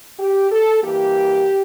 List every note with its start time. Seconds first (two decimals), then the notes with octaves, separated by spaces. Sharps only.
0.19 G4
0.51 A4
0.82 G2 E3 A#3 G4